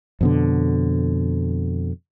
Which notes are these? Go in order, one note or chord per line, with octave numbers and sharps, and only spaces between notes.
F2 B2 D3